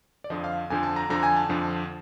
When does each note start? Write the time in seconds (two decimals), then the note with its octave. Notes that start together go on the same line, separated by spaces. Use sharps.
0.24 D5
0.30 F2 D3 F3 D#5
0.44 F5
0.70 F2 D3 F3 G#5
0.83 A5
0.96 A#5
1.10 F2 D3 F3 A#5
1.23 G#5
1.37 A5
1.49 F2 D3 F3